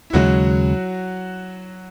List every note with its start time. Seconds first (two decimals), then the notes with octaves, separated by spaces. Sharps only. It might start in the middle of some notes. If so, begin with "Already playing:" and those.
0.10 E4
0.13 D#2 C#3 F#3 G#3 F#4